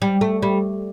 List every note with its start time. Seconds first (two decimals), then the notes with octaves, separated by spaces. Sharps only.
0.02 G3
0.21 A3
0.42 G3